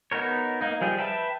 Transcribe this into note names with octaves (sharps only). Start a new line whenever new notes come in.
B3 D#4 F#4 A#4 C#5
A#3 D#4
F3 G3 G#4
B4 E5 G5 A5 B5